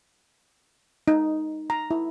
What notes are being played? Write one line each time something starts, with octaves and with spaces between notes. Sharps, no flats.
D#4
A#5
E4